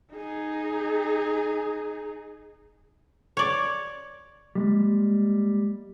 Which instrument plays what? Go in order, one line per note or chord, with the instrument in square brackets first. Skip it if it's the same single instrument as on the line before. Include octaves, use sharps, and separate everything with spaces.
[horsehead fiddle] D#4 G#4
[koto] C#5 D5
[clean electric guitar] G3 G#3 A#3